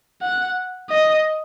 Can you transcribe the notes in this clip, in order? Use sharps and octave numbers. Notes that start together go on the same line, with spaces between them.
F#5
D#5